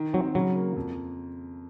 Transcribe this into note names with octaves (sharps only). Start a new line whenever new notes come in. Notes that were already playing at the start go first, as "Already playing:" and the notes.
Already playing: D#3
F#3 C4
C#3 F#3
A#3
F2